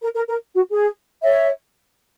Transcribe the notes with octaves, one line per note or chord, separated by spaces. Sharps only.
A#4
A#4
A#4
F#4
G#4
C#5 E5